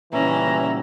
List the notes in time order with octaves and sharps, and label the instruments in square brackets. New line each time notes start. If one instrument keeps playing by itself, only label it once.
[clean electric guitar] A#2 C#3 G3 [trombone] E3 [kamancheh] C#4 E5 [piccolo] A#5